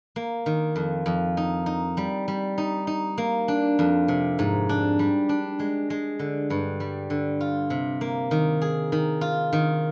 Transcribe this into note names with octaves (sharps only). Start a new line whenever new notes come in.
A#3
D#3
F2
F2
D#4
D#4
G3
G3
D#4
D#4
A#3
D4
F2
C3
G#2
D4
G3
D4
G#3
G#3
D3
G2
G3
D3
F4
C3
A#3
D#3
G#4
D#3
F4
D#3